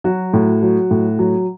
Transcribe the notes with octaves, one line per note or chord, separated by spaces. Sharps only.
F#3 F#4
A2
F#3
A2
F#3